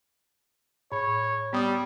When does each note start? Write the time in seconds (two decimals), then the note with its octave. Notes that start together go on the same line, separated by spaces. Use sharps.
0.92 A2 C#5 B5
1.53 G3 B3 D#6